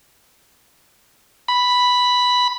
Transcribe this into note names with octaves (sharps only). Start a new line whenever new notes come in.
B5